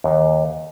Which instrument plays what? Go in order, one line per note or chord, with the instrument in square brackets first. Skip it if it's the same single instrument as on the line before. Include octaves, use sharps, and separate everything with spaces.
[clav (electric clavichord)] D#2